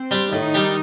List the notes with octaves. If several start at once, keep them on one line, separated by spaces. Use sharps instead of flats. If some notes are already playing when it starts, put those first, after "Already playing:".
Already playing: C4 C5
G3 D4 G4
A2 D#3 D#4
G3 D4 G4